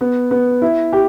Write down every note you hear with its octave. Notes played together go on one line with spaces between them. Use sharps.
B3
B3
E4
G4